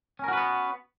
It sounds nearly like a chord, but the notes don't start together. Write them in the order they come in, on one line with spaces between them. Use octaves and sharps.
C#4 A#4 F#4 B4 B3